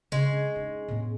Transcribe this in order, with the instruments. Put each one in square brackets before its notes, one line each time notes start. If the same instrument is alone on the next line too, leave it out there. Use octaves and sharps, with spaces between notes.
[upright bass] C#3 [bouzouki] G#3 [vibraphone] C#4 D4 G#4
[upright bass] D#4
A2 B3